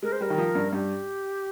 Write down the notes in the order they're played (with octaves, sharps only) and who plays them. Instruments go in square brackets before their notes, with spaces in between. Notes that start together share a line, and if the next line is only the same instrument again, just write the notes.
[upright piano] G#3 [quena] A#4
[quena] C5
[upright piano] G3 [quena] A#4
[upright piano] D#3
F3
G2
[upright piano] G2 [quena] G4